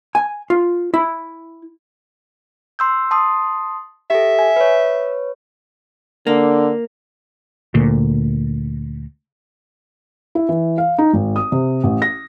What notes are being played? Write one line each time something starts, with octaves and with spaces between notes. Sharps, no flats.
G#5
F4
E4
C6 E6 G6
A5 C6 D#6
G4 A4 E5
G#5
B4 C#5
D3 A#3
D2 A#2
E4
E3
F5
D#4
G#1
D#6
C3
A1
A#6